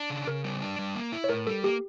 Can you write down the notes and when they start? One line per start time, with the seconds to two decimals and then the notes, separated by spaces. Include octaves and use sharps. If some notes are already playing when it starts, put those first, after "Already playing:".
Already playing: D4
0.10 C#3
0.27 C#3 A#4
0.44 G3
0.62 D4
0.79 G3
0.95 A#3
1.12 E4
1.24 C#5
1.29 A2 A#4
1.47 G3 A4
1.64 A#3 G4